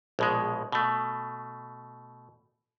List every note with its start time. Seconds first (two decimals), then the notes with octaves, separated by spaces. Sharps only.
0.19 A#1 B2 G#3
0.72 B2 A3